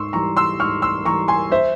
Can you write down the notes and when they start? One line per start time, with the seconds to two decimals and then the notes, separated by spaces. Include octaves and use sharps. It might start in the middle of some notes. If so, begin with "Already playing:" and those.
Already playing: G#2 C6 C#6 E6
0.13 E3 G3 A#5 C#6
0.37 C6 E6
0.60 G#2 C#6 F6
0.82 C6 E6
1.05 E3 G3 A#5 C#6
1.28 G#5 C6
1.52 C5 E5